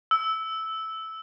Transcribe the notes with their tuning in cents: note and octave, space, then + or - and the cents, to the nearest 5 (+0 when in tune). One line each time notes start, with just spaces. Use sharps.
E6 -10